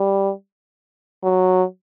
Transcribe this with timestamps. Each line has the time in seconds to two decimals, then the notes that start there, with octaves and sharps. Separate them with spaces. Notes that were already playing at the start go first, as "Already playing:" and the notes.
Already playing: G3
1.24 F#3